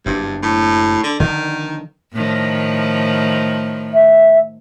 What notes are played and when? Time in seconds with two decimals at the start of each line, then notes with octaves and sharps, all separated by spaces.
0.06 F#1 G2 D4
0.43 A2
1.03 D3
1.20 D3 D#3 F3
2.13 A2 D#3 F3
3.93 E5